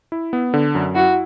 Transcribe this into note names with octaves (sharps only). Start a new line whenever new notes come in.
E4
B3
D3
F#2
E4 F#4